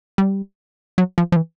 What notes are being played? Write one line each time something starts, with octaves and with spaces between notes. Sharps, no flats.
G3
F#3
F3
F3
E3